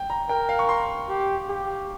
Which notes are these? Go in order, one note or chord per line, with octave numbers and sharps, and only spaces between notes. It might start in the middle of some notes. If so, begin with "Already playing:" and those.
Already playing: G5
A#5
A#4 G5
F5
C#6
C6
G4
G4